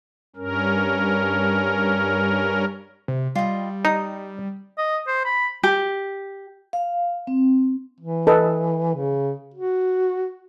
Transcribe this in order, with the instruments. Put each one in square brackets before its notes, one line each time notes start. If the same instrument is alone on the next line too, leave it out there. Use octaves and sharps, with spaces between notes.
[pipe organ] G2 C#4 A#4
[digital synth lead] C3
[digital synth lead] G3 [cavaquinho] F4 D#5
[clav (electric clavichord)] D#4 [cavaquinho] D#6
[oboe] D#5
C5
B5
[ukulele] G4
[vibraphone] F5
C4
[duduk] E3
[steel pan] A4 B4 D#5
[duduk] C#3
F#4